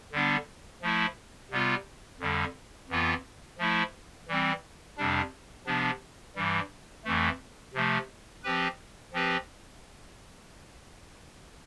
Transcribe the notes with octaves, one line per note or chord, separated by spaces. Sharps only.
D3 G3 B3 D4
F3 A3 E4
C3 G3 B3 F4
F2 D3 G3
F2 E3 B3 F4
F3 A3 E4
E3 G3 C4
F2 C3 G3 D4
C3 F3 B3 D4
G2 E3 G3
F2 E3 A3
C3 F3 A3
F3 C4 G4 B4
F3 C4 G4 B4